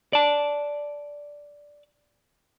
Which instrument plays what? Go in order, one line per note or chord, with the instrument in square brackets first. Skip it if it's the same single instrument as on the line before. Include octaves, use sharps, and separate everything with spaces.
[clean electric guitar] D5 A5